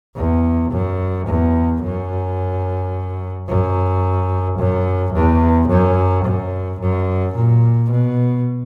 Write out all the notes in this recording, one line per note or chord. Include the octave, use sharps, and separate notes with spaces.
E2
F#2
E2
F#2
F#2
F#2
E2
F#2
F#2
F#2
A#2
B2